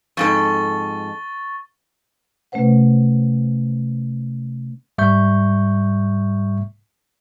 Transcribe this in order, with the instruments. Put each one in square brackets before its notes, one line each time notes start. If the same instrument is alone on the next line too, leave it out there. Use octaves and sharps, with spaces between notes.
[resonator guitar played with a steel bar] F2 G#2 A4 [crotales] C#6 A6 G7
[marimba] C3 A3 C#4 B4 C5 F#5
[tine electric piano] G#2 G3 E5 C#6 G6